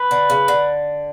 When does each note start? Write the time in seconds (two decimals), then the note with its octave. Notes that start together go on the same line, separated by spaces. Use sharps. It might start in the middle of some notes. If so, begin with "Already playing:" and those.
Already playing: B4
0.11 D3
0.30 C#3
0.48 D3